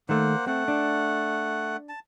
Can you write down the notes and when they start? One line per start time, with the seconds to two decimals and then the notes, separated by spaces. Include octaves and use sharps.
0.09 D#3 A3 A#3 C5 F#5
0.47 A3 C4 F#5
0.68 D4
1.89 A5